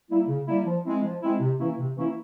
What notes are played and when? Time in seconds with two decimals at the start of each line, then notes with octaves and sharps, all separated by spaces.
0.10 G3 A#3 E4
0.28 C#3
0.47 G3 A#3 E4
0.66 F3
0.85 G#3 C4 E4
1.04 F3
1.22 G#3 C4 E4
1.40 C3
1.60 E3 A#3 C#4 E4
1.79 C3
1.97 E3 A#3 C#4 E4